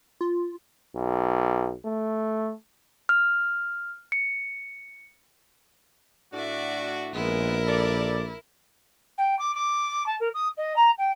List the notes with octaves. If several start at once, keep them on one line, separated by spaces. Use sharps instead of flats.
F4
B1
A3
F6
C#7
A2 D4 F#4 D5 E5
A#1 G#3 B3 E4 A#4
A4 D5
G5
D6
D6
A5
A#4
D#6
D#5
A#5
G5